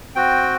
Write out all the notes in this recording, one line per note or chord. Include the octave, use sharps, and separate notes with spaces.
C4 F#4 G5